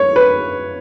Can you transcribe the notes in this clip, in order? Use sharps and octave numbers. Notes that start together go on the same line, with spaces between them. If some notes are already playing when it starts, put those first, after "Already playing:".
Already playing: C#5
B4